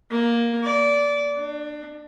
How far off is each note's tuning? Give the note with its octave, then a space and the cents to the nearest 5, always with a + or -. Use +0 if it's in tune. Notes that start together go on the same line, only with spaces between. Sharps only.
A#3 +10
D5 -20
D4 +25